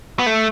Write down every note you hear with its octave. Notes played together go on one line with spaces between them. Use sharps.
B3
A3